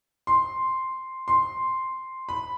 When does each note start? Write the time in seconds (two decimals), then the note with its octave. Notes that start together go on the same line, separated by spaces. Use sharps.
0.27 C6
1.28 C6
2.29 B5